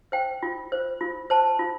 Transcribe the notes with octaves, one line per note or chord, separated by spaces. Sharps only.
C5 G5
F4
C5
F4
C5 A5
F4